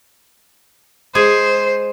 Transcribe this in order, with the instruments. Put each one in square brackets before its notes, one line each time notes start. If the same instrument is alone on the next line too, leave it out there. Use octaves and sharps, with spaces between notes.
[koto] G#3 G#4 [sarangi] C5